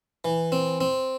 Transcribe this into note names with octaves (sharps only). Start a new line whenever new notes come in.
E3
C4
C4